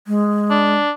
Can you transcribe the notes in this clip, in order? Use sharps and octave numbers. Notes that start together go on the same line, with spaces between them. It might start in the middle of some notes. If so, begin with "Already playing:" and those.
G#3
D4